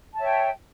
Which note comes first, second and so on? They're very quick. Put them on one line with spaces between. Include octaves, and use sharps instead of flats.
A5 E5 C#5 G5